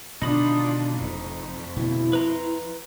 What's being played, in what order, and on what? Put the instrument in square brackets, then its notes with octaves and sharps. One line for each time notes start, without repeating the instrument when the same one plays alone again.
[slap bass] B2 D3 D#3 [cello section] D4 F4 [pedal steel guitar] D#4 B5 D#6
[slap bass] F1 A2 [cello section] F2
[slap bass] B2 D3 A3 [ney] E4
[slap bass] F3 [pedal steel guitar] B4 A#5 C6